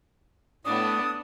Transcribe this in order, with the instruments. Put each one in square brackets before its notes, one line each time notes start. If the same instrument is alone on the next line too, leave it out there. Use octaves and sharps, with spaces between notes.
[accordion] A2 [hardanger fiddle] B3 D4 [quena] D#6